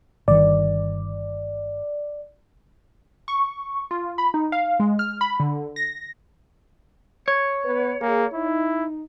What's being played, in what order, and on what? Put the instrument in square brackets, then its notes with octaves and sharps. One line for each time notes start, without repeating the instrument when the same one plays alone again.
[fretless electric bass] G1 D#3 [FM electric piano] D5
[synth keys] C#6
F4
B5
D#4
F5
G#3
F6
B5
D3
A#6
[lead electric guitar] C#5
[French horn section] B3 B4
[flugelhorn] A#3 [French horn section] G#4
[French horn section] D#4 [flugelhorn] E4